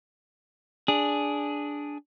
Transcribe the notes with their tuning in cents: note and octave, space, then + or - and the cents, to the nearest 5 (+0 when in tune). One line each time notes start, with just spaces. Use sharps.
D4 -5 G#4 +0